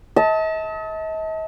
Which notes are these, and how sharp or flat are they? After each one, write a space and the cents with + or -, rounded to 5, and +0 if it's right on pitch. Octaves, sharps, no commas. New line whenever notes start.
D#5 +45 A5 +0